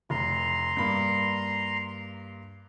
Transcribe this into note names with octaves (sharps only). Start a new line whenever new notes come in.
F1 A#5 C6
G2 A#3 B5